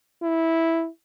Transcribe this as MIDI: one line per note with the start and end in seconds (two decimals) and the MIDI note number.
0.23 0.88 64